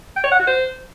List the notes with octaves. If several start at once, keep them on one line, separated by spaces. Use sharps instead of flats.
G5
C#5
F#5
F#4
C5